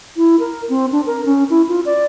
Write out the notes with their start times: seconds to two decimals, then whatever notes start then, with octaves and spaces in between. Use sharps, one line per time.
0.17 E4
0.40 A#4
0.69 C4
0.92 D4
1.06 A#4
1.26 C#4
1.50 E4
1.69 F4
1.86 D5